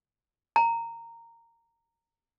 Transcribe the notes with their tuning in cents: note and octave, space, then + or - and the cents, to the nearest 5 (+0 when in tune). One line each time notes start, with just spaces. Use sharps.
A#5 -15